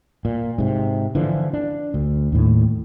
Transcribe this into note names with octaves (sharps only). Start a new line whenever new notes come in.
A#2
G#2 C3
D3 E3 F3
D4
D2
D#2 A2